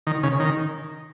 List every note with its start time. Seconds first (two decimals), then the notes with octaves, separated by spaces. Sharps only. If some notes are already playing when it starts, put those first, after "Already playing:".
0.07 D#3
0.23 C#3
0.40 D#3